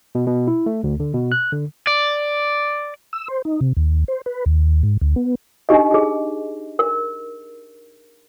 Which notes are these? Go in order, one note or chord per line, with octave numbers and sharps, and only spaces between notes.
B2
B2
E4
A3
D2
D3
B2
F#6
D3
D5
E6
C5
D#4
C3
D#2
C5
B4
D#2
G#2
D2
B3
D4 D#4 G4 D#5
G4 G#4
A#4